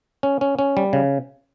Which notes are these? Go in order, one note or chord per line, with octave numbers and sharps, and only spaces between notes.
C#4
C#4
C#4
G3
C#3